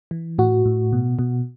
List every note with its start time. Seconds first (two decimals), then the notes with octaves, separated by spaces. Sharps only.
0.11 E3
0.38 A2 F#4
0.66 A2
0.93 B2
1.19 B2